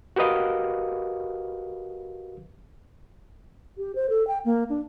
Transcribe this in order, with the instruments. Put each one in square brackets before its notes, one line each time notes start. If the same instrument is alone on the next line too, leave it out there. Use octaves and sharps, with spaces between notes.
[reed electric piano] F#4 G4 A#4 B4 D#5 F5
[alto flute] G4
C5
A4
G5
A#3
D4